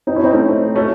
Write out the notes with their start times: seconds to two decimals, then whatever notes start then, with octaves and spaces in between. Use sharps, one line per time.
0.07 C4 D#4
0.16 C#4 E4
0.24 C4 D#4
0.33 A3 C#4
0.75 A3 C#4